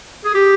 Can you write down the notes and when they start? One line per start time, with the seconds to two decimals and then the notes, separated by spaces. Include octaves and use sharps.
0.25 G#4
0.34 G4